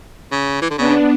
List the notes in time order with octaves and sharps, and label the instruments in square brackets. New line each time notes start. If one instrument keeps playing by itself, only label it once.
[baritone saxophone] C#3
E3
D3
[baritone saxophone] C#3 [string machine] B3 D4